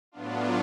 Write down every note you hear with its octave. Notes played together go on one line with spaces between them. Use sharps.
A2 F#3 B3 D4 F4